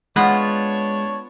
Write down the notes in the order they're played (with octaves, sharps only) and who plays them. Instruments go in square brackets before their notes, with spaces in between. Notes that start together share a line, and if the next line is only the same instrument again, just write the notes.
[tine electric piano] G#3 [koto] B3 F4 [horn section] D4 C#5